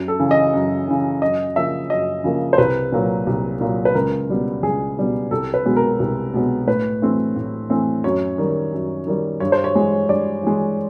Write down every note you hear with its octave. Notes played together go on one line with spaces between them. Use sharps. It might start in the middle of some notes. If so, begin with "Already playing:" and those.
Already playing: F#2
A4
C#3 E3
D#5
F#2
C#3 E3
F#2 D#5
C#3 F3 A#3 E5
F#2 D#5
C#3 F3 A#3
C5
C2 B4
A#2 F#3 A#3
C2
A#2 F#3 A#3
B4
C#2 A#4
B2 G3 B3
C#2 G#4
B2 G3 B3
C2 A4
B4
B2 G#3 B3
A#4
C2
B2 G#3 B3
A2 B4
E3 A3 C4
A2
E3 A3 C4
F#2 C#5
D#3 G3
F#2
D#3 G3
G2 C#5
C5
C#5
E3 G#3
G2 D5
E3 G#3